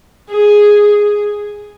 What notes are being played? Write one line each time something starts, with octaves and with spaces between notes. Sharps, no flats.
G#4